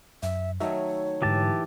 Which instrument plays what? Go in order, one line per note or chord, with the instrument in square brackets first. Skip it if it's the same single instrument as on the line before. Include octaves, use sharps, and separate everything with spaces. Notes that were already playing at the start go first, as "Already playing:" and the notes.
[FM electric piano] F#2 [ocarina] E5
[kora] D#3 F#3 A3 [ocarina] C#5 [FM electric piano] E5
[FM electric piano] G#2 D3 [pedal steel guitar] E3 G4 A5